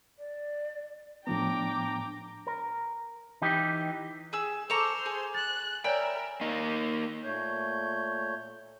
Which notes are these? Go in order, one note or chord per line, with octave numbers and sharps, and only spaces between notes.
D5
A2 F3 B3 D4 G5 A#5 D6
A#4
E3 D#4 G4
G#4 E6
A4 C5 A#5 C#6 D6 F7
G#4
F#6 A6
A#4 C#5 D5 E5 G5 G#5 B5
A#3 D#4
A#2 A3 C#5 G6